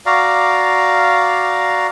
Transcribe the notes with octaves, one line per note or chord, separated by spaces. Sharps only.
F#4 D5 F5 A#5